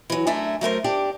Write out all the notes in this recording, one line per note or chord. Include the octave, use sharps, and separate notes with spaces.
E3 F#3
F#2 A3 D4 E5 G#5 A#5
F#3 A3 A#4 C5
D4 G4 D5